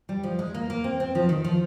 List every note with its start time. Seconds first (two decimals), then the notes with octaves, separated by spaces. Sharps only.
0.09 G3
0.23 F3
0.39 G#3
0.54 A#3
0.70 A#3
0.84 C4
1.00 C4
1.15 F3
1.29 D#3
1.44 F3